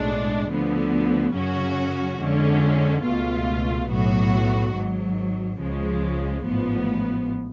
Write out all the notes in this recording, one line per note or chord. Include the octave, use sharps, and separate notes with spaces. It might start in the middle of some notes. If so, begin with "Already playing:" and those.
Already playing: B1 A2 G#3 D4
D2 D3 F3 B3
F#2 C#3 F#3 C#4 F#4
F2 D3 G#3 C#4
C#2 B2 A3 F4
B1 A2 F#3 B3 F#4
G#1 G#2 F#3
C#2 C#3 F3 G#3
A1 G#2 F3 B3